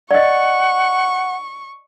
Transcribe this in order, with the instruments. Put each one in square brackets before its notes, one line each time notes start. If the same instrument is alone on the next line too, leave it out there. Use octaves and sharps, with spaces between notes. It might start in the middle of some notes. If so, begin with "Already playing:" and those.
[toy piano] D5 D#5 [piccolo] F#5 [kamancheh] C#6